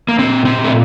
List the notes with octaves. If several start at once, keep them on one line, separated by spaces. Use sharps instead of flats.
A#3
A#2 C4
C4
A#2
A3